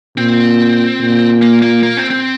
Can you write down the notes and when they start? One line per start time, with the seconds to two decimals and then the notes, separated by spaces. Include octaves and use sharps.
0.17 A#2 C4
1.01 A#2
1.42 A#3
1.62 A#3
1.83 A#3
1.97 C4
2.10 C4